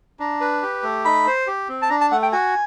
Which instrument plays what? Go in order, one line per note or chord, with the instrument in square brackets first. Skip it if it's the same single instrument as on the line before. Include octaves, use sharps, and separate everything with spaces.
[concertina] D4 [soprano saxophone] A#5
[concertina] B4
G4
A3
[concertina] D#4 [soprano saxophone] B5
[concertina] C5
G4
C4
[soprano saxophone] A5
[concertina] D4 [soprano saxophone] A#5
[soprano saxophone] A5
[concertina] A3 [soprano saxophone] F#5
[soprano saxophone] G5
[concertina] F#4 [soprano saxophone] G#5